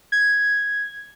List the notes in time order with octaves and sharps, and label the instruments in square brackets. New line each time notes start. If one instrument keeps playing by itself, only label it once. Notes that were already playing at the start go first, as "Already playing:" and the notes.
[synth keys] G#6